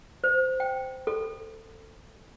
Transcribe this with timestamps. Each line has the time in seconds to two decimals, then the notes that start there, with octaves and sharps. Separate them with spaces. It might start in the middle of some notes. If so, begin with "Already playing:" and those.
0.24 C5
0.60 G5
1.07 A4